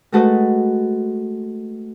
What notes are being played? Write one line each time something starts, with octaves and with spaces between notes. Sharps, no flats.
G#3 A3 F#4 A4 B4 D#5